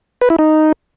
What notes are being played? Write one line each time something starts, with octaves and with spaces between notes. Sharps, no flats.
B4
E4
D#4